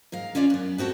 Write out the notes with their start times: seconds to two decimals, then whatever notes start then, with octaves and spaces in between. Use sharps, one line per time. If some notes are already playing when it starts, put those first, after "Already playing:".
0.12 G#2 A#4 F5
0.35 C#4 F4 C#5 D5 F5
0.50 F#2 B3
0.78 B3 C4 F#4 A4